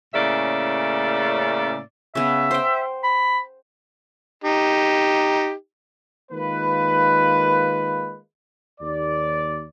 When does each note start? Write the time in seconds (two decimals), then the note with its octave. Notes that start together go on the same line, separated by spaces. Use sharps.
0.14 A2 C#3 A#3 C#4 D5 E5
2.15 C#3 B3 E5
2.51 C5 G5
3.04 B5
4.44 D#4 G4
6.32 D#3 G#3 A#3 F4 B4
8.81 D#2 D5